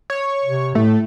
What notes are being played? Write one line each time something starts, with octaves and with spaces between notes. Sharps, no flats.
C#5
C3
A2 A3